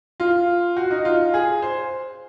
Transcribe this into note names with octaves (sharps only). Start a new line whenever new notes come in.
F4
F#4
D#4
F4
G#4
C5